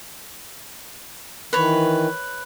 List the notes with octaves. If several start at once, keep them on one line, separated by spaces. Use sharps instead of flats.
D#3 E3 B4 C#5